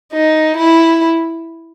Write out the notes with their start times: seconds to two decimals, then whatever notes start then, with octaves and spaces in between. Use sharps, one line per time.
0.12 D#4
0.57 E4